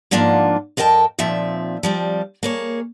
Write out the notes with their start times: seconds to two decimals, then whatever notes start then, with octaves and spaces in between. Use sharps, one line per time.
0.11 G#2 F3 A#3 D4 F4 F#5
0.77 F2 A#4 D#5 G5 A5
1.19 D#2 A#2 F3 C4 E5
1.83 F3 G3 C4
2.43 A#3 G#4 C#5